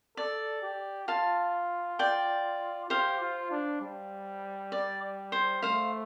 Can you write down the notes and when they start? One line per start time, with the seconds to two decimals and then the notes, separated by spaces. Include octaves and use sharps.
0.17 A4 D5
0.62 G4
1.08 F4 F5 A5
1.99 D5 G5
2.90 G4 C5 F5
3.20 F4
3.51 D4
3.81 G3
4.72 D5
5.32 C5
5.62 A3 C5 F5